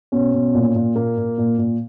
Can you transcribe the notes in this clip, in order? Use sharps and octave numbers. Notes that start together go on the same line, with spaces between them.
B2 C#4
B2
A#2
A#2
A#2 A#3
A#2
A#2
A#2